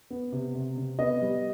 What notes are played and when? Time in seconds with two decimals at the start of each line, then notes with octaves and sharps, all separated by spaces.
0.10 B3
0.32 C3
0.55 C3
0.77 C3
0.99 B3 D#5
1.21 G3